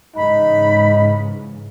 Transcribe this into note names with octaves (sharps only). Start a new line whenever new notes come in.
G#2 C#3 E3 D#4 B5